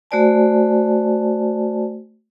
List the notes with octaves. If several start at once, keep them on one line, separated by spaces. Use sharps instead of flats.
A3 F#4 C5 D5 G#5 A5